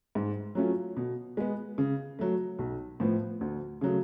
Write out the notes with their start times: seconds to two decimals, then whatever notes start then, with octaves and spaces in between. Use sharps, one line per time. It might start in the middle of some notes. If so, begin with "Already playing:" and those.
0.15 G#2
0.55 F#3 A3 C#4 F4
0.97 B2
1.37 G#3 B3
1.78 C#3
2.19 F#3 A3
2.59 B1
3.00 A2 F3 B3
3.41 D2
3.81 C#3 F#3 A3